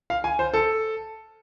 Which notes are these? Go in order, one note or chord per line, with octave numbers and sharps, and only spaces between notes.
F5
G#5
C5
A4